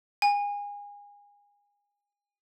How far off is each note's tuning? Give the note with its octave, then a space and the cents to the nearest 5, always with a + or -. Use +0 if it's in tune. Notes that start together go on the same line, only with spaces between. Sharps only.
G#5 -30